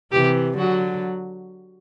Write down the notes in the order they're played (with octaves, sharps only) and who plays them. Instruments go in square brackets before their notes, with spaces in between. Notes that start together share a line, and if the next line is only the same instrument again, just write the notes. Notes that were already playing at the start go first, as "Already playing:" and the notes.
[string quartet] C3 E3 [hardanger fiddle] G4
[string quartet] D3 F#3 [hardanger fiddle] F#4